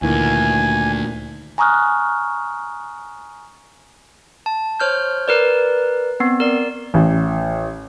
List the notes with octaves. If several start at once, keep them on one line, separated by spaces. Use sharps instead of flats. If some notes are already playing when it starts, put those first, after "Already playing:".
D2 A#2 D#3 E3 G#5
G#5 A#5 C#6 D#6 F6 F#6
A5
C5 C#5 F6 G6
A#4 B4 D5
B3 C4
A#4 D5
A1